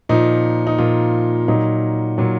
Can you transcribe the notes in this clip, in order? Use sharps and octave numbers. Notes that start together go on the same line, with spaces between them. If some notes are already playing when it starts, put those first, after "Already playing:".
A#2 F3 D#4
D#4
A#2 F3 F4
A#2 F#3 D#4
A#2 F#3